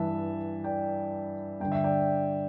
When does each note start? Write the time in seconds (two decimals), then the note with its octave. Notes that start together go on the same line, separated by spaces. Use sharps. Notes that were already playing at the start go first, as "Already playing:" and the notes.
Already playing: G2 E3 E5 A5
0.64 D5 G5
1.60 G2 D3 G5
1.72 E5
1.84 D5 G5